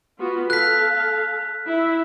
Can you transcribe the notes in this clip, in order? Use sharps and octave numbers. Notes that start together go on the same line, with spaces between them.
B3 F4 F#4
A4 F5 F#6 B6
E4 E5